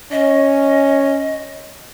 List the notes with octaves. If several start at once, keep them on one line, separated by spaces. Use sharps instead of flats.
C#4 D#5